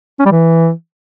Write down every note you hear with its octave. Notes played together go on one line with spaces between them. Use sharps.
C#4
G3
E3